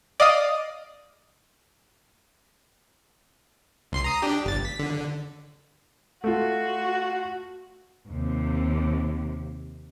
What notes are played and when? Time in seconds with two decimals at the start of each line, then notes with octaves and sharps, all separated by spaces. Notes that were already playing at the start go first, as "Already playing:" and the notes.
0.20 D5 D#5 F5 D#6
3.92 C#2 C6 C7
4.04 A#5 D#6
4.22 D4 G4
4.45 G1 A6
4.65 B6
4.79 D3
6.24 A3 F4 F#4
8.09 D#2 C3